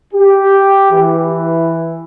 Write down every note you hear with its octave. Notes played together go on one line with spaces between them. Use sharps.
G4
E3